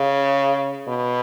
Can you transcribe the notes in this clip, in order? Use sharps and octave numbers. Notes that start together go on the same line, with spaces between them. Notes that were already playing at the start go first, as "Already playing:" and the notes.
Already playing: C#3
B2